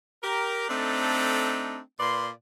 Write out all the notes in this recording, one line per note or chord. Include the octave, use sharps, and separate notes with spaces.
G4 A#4
A3 C4 D4 D#4 A4
A#2 B4 D5 C6